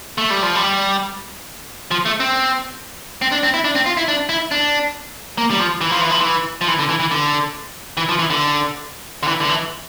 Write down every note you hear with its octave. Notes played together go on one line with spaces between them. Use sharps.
A3
G3
F3
G3
F3
A3
C4
C4
D4
C4
E4
D4
C4
F4
E4
D4
E4
D4
A#3
G3
F3
E3
F3
E3
F3
E3
F3
E3
D3
E3
E3
D3
E3
F3
E3
D3
D3
E3
D3
E3